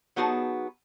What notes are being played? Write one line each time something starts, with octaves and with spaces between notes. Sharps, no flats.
F#3 B3 D#4 F#4 G#4 A5